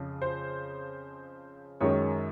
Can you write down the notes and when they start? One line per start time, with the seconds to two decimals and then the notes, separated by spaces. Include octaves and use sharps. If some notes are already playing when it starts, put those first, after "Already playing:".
Already playing: F2 C#3 F3
0.22 C5
1.80 F#2 D#3 G#3 C#4 C#5